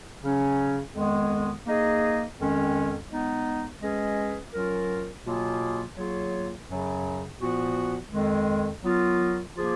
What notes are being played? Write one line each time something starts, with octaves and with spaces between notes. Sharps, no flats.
C#3 F#3 C#4
F2 D#3 G#3 B3
A#3 D#4 G#4 D#5
F2 D#3 G#3 C#4
G#3 B3 D#4
G#3 C#4 G#4 B4 D#5
F#3 C#4 F4 A#4
B2 F#3 A#3 F4 G#4
F#3 A#3 F4 G#4 C#5
F#2 C#3 F#3
A#2 F3 B3 F#4
F2 D#3 G#3
F#3 B3 F4 A#4
F3 A#3 F4 G#4